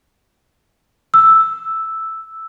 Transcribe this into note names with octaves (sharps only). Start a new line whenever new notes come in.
E6